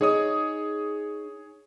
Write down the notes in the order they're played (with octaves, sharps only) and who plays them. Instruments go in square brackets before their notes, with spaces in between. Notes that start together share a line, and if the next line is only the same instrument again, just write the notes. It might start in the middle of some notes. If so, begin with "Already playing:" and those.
[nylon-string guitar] D#4 [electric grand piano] G#4 C#5 D#6